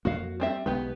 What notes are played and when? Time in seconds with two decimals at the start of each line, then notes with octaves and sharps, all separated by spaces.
0.05 F2 A#3 F#4 F5
0.40 G3 C4 E5
0.66 B1 B2 G#3 B3 G4 B4